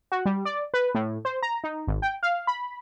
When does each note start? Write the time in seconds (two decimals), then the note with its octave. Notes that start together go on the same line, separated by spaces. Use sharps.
0.12 F#4
0.25 G3
0.45 D5
0.74 B4
0.95 A2
1.25 C5
1.43 A#5
1.64 D#4
1.87 G#1
2.02 G5
2.23 F5
2.47 B5